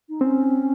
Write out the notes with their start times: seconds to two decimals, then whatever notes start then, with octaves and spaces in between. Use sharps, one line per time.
0.09 D#4
0.21 C4 C#4